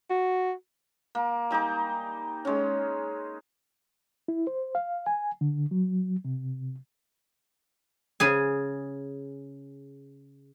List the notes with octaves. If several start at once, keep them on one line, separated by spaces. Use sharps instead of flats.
F#4
A#3
G3 D#4 G#5 D6
G#3 C#4
E4
C5
F5
G#5
D3
F#3
C3
C#3 G#4 G#5